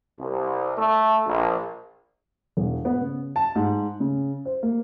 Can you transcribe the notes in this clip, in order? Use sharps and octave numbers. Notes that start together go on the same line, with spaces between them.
C2
A3
A#1
E1
B3
C#3
A5
G#2
C#3
C5
A#3